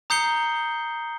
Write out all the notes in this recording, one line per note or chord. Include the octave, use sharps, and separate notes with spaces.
A#5 D#6 G6 C7 C#7 G7